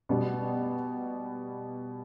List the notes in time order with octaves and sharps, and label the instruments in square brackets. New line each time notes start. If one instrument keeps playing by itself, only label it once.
[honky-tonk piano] B2 G3 B3